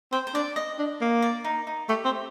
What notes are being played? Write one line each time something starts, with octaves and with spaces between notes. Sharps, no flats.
C4 C5
C5
D4 D5
D#5
D4
A#3
D5
D#4
D#4
A3 G4
C4